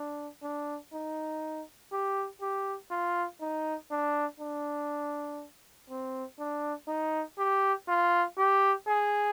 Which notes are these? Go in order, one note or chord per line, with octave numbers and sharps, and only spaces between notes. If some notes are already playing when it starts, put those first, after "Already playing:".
Already playing: D4
D4
D#4
G4
G4
F4
D#4
D4
D4
C4
D4
D#4
G4
F4
G4
G#4